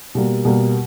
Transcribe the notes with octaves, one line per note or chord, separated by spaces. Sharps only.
B2 G3 A#3
B2 G3 A#3